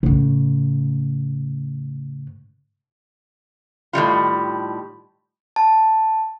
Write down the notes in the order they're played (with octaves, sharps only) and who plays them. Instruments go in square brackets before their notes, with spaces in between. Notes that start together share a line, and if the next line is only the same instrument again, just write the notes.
[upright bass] A2 C#3
[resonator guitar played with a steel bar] A2 D#3 G3 F4
[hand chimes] A5